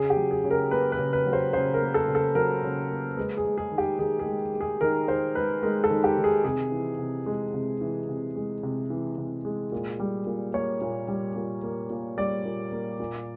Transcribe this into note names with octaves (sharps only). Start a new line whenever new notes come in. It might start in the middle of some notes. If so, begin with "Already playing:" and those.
Already playing: C#3 G#4
G4
F#3
G#4
C#3
A#4
A#3 B4
B4
C#3
B4
F#3
C5
C#3 C5
A#4
A#3
A4
C#3
A4
F#3 A#4
C#3
A#3
G#3 B4
G#4
G#3
G#4
D#3
G4
D#3 G#4
G#4
G#3
G#3
G#4
D#3 A#4
D#3 C5
G#3 B4
G#3 A#4
A4
D#3
G4
D#3
G#4
C3 G#4
E3
C3
G#3
C3
E3
C3
G#3
C3
E3
C3
G#3
A#2
G3
A#2
A#3 C#5
A#2
G3
A#2
A#3
A#2
G3 D5
A#2
A#3
A#2